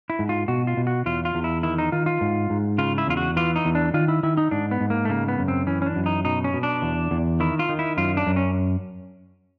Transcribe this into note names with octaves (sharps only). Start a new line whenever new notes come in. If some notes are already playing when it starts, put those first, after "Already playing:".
E4
G#2
F4
B2 F#4
F4
B2
F#4
E2 F4
F4
E2
E4
D#3 E4
D#4
D#3 F4
F4
G#2
G#2
C#3 F4
E4
E2 F4
F#4
E3 F4
D#4
E2
D4
D#3 F4
E4
D#3 E4
D#4
G#2 D4
B3
G#2
A#3
A3
C#3 A#3
B3
F#2
C4
E3 C#4
C#4
D4
F#2
D#4
B2 D#4
C#4
B2
D4
E2
E2
D#3 E4
F4
D#3
E4
F#2 F4
D4
F#2
C#4